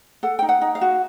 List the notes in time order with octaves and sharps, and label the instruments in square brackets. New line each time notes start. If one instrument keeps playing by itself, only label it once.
[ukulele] A4 F#5
D#4 G5
F#5
D#4
F5
F#4